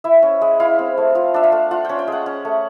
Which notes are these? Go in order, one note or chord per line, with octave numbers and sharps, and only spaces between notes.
E4 E5
C#4
G#3
E4 F5
C4
A3
F4 F5
D4 E5
F5
A3
F4 F#5
C#4 G5
G5
G#3 F#5
C#4
A3